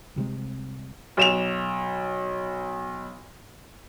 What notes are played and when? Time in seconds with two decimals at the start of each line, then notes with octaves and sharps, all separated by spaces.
0.16 C2 C3 D#3 G#3
1.17 B1 E7 F7